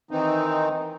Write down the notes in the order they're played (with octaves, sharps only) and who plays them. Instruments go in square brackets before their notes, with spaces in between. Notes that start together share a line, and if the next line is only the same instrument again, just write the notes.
[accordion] D#3 E3 C4 D#4